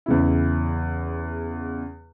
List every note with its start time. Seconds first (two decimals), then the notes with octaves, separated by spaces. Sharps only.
0.06 E2 C#3 E4